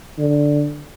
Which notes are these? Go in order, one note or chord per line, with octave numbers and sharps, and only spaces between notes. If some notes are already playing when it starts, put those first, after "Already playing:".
D3